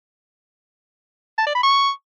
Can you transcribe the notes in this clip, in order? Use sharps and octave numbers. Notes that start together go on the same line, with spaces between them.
A5
D5
B5
C#6